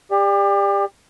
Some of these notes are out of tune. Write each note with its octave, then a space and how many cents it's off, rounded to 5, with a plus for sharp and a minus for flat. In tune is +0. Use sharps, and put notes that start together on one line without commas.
G4 +35 D5 +10